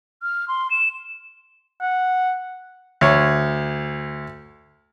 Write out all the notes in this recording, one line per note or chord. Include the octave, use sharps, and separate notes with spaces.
F6
C6
E7
F#5
D2 C#5